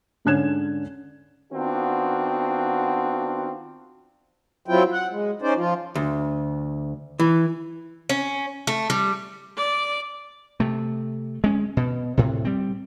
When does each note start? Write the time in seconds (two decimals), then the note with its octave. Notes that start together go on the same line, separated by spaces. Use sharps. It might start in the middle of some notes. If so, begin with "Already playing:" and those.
0.25 G#2 D3 C#4 F#6 G#6 E7
1.51 D#3 B3 C4 D4 F4 F#4
4.68 F#3 C4 E4 F4 G5
4.92 F#5
5.11 G#3
5.42 C#4 D#4 C5 D5
5.56 F3 F4
5.95 D2
7.20 E3
8.09 C#4
8.67 A3
8.90 G3
9.57 D5
10.60 C3 A3
11.44 G#3 C#4
11.77 B2
12.17 A2 C3
12.45 G3 C4